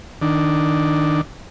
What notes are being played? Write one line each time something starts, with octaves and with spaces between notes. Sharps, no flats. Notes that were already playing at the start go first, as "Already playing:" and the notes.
D#3 D4